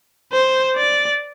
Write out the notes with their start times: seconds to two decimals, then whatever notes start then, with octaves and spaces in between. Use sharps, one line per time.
0.32 C5
0.76 D5